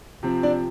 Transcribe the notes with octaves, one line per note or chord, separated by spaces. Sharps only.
C3 F3 C4
D4 D5